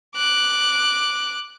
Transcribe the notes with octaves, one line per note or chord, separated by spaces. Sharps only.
D6 F#6